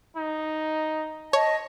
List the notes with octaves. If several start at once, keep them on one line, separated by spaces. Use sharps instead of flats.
D#4
C#5 D#5 A5